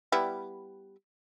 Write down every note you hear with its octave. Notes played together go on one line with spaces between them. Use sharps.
G3 B3 E4